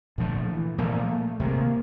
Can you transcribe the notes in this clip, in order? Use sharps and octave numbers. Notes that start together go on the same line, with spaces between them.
A#2 D3 F3 A3
E3
A#2 F3 A3 A#3
A3
C3 D#3 G#3 A#3